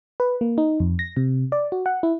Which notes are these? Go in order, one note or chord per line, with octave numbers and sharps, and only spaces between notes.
B4
A#3
D#4
F2
A#6
C3
D5
F#4
F#5
E4